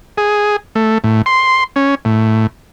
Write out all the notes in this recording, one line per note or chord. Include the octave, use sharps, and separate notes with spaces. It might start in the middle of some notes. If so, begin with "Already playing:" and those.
G#4
A3
A2
C6
C#4
A2